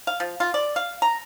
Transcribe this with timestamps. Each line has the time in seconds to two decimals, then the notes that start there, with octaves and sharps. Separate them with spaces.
0.07 F5
0.20 F3
0.40 F4
0.54 D5
0.76 F5
1.02 A#5